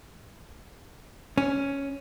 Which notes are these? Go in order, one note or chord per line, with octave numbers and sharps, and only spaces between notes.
C#4